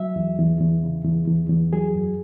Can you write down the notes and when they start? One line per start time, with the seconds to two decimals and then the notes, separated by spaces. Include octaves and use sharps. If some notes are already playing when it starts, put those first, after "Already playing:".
Already playing: F#3 E5
0.16 E2
0.39 E2
0.61 E2
0.83 C#3
1.05 E2
1.28 E2
1.49 E2
1.73 F#3 G#4
1.95 F#2